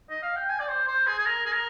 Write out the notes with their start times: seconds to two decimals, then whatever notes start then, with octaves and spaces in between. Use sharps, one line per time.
0.10 D#5
0.22 F5
0.36 G5
0.49 G#5
0.59 D5
0.68 C5
0.87 C5
1.07 G#4
1.18 G#4
1.26 A#4
1.46 G#4
1.53 A#4